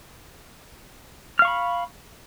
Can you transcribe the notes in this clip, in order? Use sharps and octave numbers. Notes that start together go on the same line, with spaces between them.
F5 B5 C#6 F6